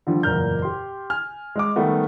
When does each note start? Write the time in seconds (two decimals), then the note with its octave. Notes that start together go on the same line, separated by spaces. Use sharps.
0.07 D3 F3 G3
0.23 F#1 E2 A#2 A#4 F6 G6
0.62 G4 C6
1.10 G#5 F6
1.55 G#3 D#5 D6
1.76 D#3 G3 A3 B3